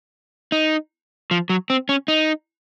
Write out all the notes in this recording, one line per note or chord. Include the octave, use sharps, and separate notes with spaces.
D#4
F3
F#3
C4
C#4
D#4